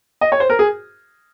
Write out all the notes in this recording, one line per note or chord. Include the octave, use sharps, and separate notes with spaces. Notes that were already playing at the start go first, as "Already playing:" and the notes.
D#5
C#5
C5
A#4
G#4